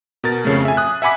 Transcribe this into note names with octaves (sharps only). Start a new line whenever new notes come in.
B2 A#4 A6
F2 C#3 A3
E5 G#5
D#6 F#6
E5 F#5 G#5 B5 D6 B6